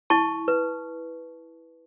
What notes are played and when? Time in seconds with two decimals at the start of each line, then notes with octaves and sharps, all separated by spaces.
0.10 E4 A5 C#6
0.48 B4